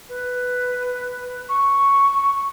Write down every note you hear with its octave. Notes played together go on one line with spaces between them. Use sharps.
B4
C#6